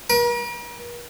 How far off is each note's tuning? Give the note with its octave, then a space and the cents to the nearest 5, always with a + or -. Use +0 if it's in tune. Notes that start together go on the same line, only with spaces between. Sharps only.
A#4 +45